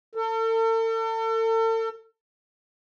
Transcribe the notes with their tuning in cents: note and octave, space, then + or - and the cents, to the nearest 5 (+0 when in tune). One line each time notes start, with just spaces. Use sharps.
A4 +40